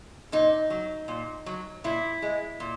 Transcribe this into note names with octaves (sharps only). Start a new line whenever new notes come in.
A#2 D#4
F#3
A#2
F#3
A#2 E4
G#3
A#2